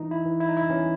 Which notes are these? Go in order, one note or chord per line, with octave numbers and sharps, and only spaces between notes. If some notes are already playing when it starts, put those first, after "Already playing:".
Already playing: E3 D#4
E4
E3
E4
D#4
E4
E3 C#4